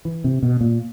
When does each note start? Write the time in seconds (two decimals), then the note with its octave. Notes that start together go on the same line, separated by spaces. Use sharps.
0.05 E3
0.24 C3
0.43 B2
0.61 A#2